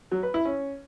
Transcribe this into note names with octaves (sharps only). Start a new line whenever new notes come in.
F#3
B4
E4
C#4